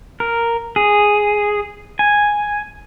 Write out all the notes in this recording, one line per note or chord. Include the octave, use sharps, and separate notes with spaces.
A#4
G#4
G#5